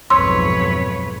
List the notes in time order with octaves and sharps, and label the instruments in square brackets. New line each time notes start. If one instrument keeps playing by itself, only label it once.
[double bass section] B1 F2 G#2 [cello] B4 C#5 [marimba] C6 E6